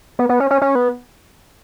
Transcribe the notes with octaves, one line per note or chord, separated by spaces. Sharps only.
B3
B3
C#4
C#4
C#4
B3